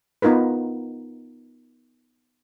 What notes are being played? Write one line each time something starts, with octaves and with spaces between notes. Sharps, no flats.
B3 D#4 F4 A#4 B4